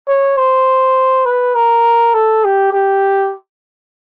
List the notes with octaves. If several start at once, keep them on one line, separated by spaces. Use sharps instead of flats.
C#5
C5
B4
A#4
A4
G4
G4